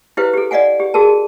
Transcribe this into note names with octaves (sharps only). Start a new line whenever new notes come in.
E4 G4 B4 C5 F5
G4 A4
D5 D#5 F5 F#5 G#5
G4
F#4 G#4 A#4 A5